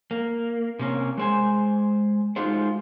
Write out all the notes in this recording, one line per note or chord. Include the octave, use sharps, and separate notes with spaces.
A#3
C3 A#3 C#4
G#3 C5 G#5
G#3 A3 D#4 F4 F#4 C5